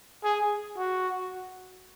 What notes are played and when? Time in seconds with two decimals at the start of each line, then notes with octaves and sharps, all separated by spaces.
0.24 G#4
0.77 F#4